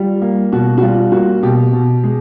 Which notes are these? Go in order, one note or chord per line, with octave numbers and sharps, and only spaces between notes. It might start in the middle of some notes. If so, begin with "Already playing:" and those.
Already playing: G3 F4
A#3
B2 F#4
F#4
G3 F4
A#3 F#4
B2 G4
B2
G#3